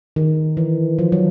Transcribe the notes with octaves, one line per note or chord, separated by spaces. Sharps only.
D#3
E3
F3
F#3